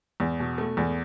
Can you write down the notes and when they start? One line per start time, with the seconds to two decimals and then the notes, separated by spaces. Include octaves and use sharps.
0.20 E2
0.40 B2
0.58 A3
0.77 E2